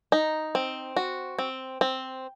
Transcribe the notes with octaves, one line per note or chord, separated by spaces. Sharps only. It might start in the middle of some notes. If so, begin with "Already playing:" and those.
D#4
C4
F#4
C4
C4